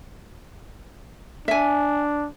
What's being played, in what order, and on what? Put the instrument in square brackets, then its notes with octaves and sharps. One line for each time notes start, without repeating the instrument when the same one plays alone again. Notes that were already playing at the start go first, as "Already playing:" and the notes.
[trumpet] D4 [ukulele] E5 G#5